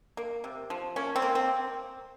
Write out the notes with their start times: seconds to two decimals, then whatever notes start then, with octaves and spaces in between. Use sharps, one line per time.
0.17 A#3
0.44 C3
0.70 F3
0.96 A#3 C#4
1.16 C4
1.22 A#3
1.35 C4